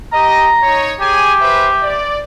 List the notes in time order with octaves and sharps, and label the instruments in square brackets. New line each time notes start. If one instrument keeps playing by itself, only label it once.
[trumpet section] G4 D#5 [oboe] A#5
[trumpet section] D#4 C#5
[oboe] G4 [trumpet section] G#4 G#5
[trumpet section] B4 C5 E5
D5